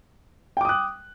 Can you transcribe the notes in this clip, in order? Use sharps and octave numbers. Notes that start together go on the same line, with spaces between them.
G5 D6 D#6 F#6